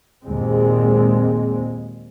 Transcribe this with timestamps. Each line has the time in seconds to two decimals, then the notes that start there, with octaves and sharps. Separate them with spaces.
0.24 D#2 A#2 G#3 C4